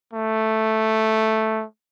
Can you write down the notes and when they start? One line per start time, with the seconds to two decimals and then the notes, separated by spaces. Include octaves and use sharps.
0.13 A3